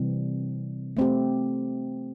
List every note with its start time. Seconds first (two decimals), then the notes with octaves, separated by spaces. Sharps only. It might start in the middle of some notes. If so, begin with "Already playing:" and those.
Already playing: C3 E3 G3 C4
0.97 A3 C4 G4